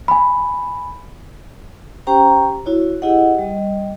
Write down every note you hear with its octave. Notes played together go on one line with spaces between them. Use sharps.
G#5 B5
C#4 G4 C5 G5 A#5
E4 F#4 C#5
E4 G4 G#4 D#5 F#5
G3 D#5